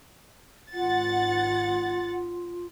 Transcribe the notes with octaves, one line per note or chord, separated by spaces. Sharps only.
G#1 F4 F#5 A6